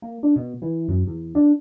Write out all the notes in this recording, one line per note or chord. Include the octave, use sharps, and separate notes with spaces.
A#3
D4
B2
E3
F#2
E2
D4